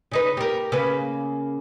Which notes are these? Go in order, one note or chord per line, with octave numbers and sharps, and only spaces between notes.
C#3 D#4 B4
G4 A#4
C#3 A#3 B4